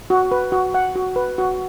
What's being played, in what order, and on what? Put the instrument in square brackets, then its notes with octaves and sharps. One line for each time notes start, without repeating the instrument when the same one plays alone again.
[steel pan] F#4
B4
F#4
F#5
F#4
B4
F#4